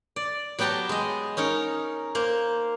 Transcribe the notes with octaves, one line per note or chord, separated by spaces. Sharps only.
D5
F#3 B3 G4 G5 A5 A#5
G#3 D#5
C#4 D#4 A#4 C#5
A#3 C5